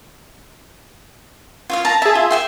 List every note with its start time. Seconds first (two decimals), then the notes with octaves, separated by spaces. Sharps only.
1.70 F4 C#5 F5
1.85 A5 A#5
2.02 G#4 E5 A5
2.15 F4
2.30 E5 G5 C6